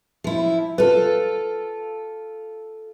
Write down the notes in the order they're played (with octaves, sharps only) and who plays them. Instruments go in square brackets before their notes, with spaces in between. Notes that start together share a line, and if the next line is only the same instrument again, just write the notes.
[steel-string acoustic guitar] F3 E4
[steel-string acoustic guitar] F4 A4 [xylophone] B4